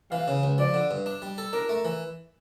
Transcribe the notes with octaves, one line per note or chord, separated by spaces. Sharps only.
E3 F5
C#3
C#2
F3 D5
D3
G2
D4
G3
A4
D4 A#4
A3
E3